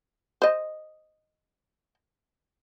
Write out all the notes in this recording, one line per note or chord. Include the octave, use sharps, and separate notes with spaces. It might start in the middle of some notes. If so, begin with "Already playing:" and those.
C5 D#5